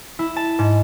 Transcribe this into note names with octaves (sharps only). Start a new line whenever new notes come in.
E4
A5
G#2